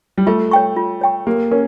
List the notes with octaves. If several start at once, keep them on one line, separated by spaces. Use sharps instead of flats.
G3
A3 F4
C#5 G5 C#6
F4
C#5 G5 C#6
A#3 G4
C#4 A#4